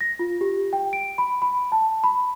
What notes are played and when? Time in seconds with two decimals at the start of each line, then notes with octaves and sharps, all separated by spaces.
0.01 A#6
0.19 F4
0.41 G4
0.73 G5
0.93 D7
1.18 B5
1.42 B5
1.72 A5
2.04 B5